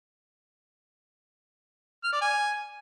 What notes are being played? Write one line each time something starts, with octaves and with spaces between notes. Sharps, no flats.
F6
D5
G#5